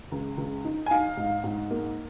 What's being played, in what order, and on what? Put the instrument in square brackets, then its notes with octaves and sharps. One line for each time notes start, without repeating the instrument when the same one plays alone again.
[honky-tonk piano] C#2
C#2
D#4
G#5
D#4 F5
G#2
G#2
A#3